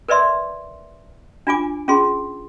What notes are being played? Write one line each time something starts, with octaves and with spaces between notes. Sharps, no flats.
A#4 B4 D5 E5 C6
D4 F4 G#5 D6
C#4 F4 G#4 C6